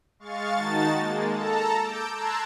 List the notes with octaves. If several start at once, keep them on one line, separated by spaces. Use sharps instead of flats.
G#3 F5 C#6 A6
D#3 D#4 F#4 A5 A6
G#3 A#3
A4 A5 A#5
D6 E6 G6 D7
A5 A#5 C6 E6 F#6 G#6